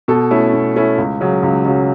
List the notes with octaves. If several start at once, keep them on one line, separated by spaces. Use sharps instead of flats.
B2 A4
A3 C#4 E4
B2
A3 C#4 E4
C#2
C#3 F#3
C#2
C#3 F#3